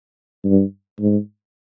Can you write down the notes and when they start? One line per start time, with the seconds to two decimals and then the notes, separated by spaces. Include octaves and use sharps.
0.45 G2
1.00 G#2